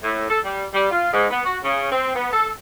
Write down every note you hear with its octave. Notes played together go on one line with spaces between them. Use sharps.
A2
A4
G3
G3
F4
G#2
B3
F#4
C#3
C4
B3
A4